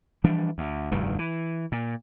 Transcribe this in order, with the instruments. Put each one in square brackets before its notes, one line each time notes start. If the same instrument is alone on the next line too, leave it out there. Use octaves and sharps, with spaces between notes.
[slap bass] E3 F3 G3 D4
D2
F1 D2 G2 D#3
E3
A#2